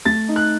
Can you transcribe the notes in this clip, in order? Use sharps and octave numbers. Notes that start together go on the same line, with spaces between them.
A3 A6
D#4
F#6